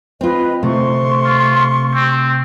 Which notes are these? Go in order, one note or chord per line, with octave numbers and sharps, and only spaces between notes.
C4 F4 B4 D#5
C3 A3 C6 C#6
F4
C4